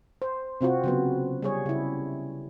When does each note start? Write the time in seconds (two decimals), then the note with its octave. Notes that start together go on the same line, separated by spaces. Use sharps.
0.22 C5
0.61 C3 C4 F4 F#4
0.84 C#3 F#3 B3
1.42 G3 G#4 C#5
1.66 C#3 E4